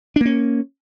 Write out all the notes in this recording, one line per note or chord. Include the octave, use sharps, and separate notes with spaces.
A#3 C#4 D4